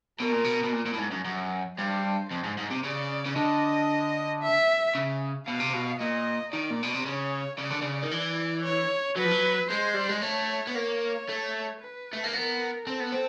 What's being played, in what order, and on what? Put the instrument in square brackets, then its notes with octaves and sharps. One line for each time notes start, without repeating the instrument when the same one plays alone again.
[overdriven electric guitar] B2 [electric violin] A#4
[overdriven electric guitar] A#2
B2
B2
A#2
A#2
A2
G#2
F#2
F#2
[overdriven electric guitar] G2 [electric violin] C5
[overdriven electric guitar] F2 [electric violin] C5
[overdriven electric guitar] G#2
G#2
C3
[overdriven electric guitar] C#3 [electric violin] D5
[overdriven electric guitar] C#3
[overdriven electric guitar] D3 [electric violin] D#5
[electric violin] E5
[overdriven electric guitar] C#3
[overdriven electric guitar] B2 [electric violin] F5
[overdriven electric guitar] C3
B2
[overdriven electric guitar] A#2 [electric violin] D#5
[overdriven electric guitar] D#3 [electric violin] D5
[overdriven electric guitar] A#2
B2
C3
[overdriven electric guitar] C#3 [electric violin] C#5
[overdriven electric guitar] C#3 [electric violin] D5
[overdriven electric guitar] D3
C#3
D#3
[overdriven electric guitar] E3 [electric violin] D5
[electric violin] C#5
[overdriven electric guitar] F#3 [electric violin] B4
[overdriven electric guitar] F3
F#3
[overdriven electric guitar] G#3 [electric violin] C5
[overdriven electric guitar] G3
G#3
[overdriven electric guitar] A3 [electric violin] C#5
[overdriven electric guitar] B3
[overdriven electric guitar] A#3 [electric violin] C#5
[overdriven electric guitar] A3
[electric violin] B4
[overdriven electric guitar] A3
A#3
[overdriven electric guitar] B3 [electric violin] A#4
[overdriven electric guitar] C4 [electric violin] A4
[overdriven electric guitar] B3
C4